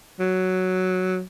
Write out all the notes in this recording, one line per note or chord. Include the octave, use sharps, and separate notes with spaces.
F#3